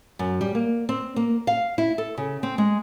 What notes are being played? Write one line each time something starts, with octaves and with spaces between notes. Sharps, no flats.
F#2
G3
A#3
C4
A#3
F5
E4
A4
C#3
C4
G#3